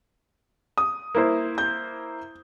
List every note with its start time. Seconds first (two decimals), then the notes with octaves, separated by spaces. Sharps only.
0.78 D#6
1.15 A#3 E4 C5
1.58 G6